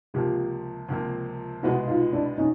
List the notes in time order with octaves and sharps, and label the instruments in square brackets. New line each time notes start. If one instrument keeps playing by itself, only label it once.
[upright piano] C#2 C3 F3 A#3 [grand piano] F4 G4
[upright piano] C#2 C3 F3 A#3
[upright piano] C2 B2 G#3 B3 [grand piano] E4 F#4
[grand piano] D#4 F4
D4 E4
[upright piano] B2 [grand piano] C#4 D#4